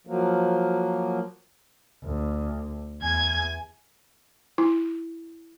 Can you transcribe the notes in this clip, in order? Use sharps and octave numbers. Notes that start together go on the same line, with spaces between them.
F3 F#3 A#3
D2
E2 G#5 G#6
E4